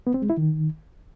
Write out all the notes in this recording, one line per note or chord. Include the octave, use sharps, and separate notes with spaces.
B3
C4
G#3
E4
D#3